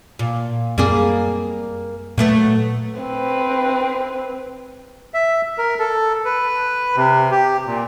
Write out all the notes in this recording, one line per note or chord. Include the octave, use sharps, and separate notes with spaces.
A#2
F#2 G3 A#3 C4 G#4
A#2 F#3 A3 B3
C4 B4
E5
A#4
A4
B4
C3
G4
A#2